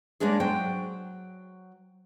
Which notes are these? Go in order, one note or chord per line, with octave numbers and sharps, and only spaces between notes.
G#3 A#3 C#4 D4 G#4
F#3 C5 G5